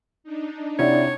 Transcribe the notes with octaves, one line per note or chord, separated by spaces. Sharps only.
D4 D#4
C3 E4 C#5 D5 F#5